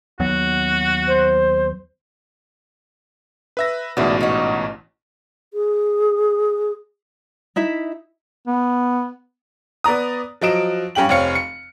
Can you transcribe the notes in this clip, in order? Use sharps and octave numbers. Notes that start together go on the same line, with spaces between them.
D#2 F#3 B3 F#4
C5
B4 E5 A#6
A1 G#2 B2 D3 D4 E4
D#4 F#4
G#4
D#4 E4 E5
B3
B3 D5 A#5 D#6
F3 F#3 D#5 D7 E7
G2 C#4 G4 G5 F#7
F1 C4 C#5 F5 C#7
C#7